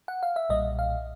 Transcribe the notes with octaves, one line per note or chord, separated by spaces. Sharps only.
F#5
F5
E5
B1 A#2 G3 D#5
F5